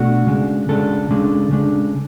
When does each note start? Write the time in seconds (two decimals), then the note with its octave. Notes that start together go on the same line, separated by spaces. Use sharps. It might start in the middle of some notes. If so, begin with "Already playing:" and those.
Already playing: B2 A3 D4 F#4
0.27 C#3 G#3 D4
0.69 C#3 G#3 D4 A4
1.11 C#3 G#3 D4
1.51 C#3 G#3 D4